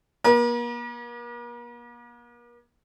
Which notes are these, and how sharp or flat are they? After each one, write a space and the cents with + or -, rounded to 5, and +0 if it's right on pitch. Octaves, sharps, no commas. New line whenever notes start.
A#3 +40 A#4 +45